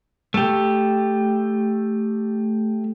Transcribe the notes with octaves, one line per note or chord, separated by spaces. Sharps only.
A3 G4